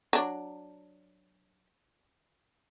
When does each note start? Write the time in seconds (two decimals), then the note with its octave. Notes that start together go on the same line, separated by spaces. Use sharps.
0.13 F#3 D4